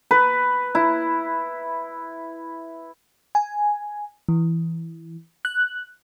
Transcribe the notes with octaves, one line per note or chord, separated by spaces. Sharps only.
B4
E4
G#5
E3
F#6